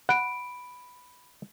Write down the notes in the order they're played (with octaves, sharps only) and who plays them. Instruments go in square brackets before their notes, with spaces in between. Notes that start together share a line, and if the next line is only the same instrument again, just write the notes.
[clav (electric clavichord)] F#5 [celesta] B5 D7